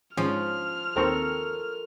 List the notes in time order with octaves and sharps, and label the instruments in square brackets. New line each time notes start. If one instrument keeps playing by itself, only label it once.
[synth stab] G#2 C#4 [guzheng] F3 [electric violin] F6
[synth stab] D#2 C4 [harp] A4 A#4 C#6